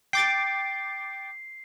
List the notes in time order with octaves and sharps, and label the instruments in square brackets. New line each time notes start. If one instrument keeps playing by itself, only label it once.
[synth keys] G5 D6 A6 [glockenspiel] C7